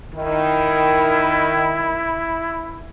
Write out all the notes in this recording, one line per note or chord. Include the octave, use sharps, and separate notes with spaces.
D#3 E4